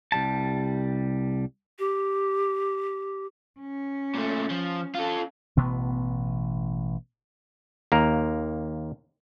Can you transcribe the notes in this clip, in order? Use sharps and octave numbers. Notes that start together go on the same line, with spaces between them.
C2 G3 A5
G4
C#4
A#2 A3
F3
F4 A4
A1 B2 E3 B3
D#2 A#3 A#4